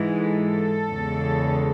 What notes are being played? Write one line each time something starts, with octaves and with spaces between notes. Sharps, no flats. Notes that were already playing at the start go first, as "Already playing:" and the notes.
Already playing: G#2 E3 G#3
A4
E2 C#3 G#3